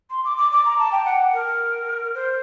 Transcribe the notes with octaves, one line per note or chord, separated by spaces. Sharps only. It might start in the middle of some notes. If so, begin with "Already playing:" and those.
C6
D6
D6
D6
A#5
A5
G5
F#5
A#4
C5